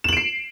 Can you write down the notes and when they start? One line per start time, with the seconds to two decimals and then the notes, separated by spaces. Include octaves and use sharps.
0.04 E7
0.08 F#7
0.13 D7
0.17 C7